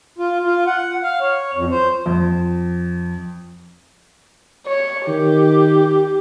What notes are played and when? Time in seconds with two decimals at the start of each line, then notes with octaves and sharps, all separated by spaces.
0.18 F4
0.45 F4
0.67 F#5
1.03 F5
1.21 C#5
1.55 F2
1.71 C5
2.06 F2
4.67 C#5
5.07 D#3 G4